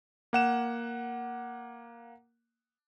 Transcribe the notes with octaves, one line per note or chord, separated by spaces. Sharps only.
A#3 F#5 E7